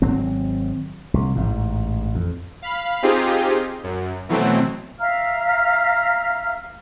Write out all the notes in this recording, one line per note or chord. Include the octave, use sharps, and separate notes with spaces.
G#1 F#3 C4
C2
A1 G#2
F2
F5 B5
C4 D#4 F4 G4 G#4
F#2
B2 E3 F#3 A3 C4
E5 F5 A#5 F6